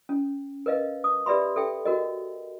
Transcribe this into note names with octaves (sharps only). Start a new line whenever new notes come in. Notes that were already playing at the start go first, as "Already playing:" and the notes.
C#4
A#4 B4 D#5 F5
D#6
G4 B4 D5 E5 B5 C6
A4 E5 G5
F#4 A#4 D#5